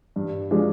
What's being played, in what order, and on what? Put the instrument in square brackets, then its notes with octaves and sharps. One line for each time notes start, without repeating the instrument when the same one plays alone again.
[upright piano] G2
F3 G#3 D4